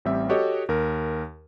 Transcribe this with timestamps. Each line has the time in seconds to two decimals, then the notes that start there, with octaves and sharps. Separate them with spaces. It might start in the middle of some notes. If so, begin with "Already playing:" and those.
0.05 A1 G3 C4 G4 E5
0.29 F#4 G4 A4 C#5 D#5
0.69 D#2 A#4